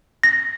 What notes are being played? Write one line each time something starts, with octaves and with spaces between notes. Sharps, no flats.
A#6